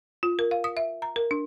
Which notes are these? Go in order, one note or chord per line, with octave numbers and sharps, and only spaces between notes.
F4
A#4
F5
D#6
E5
A#5
A#4
D4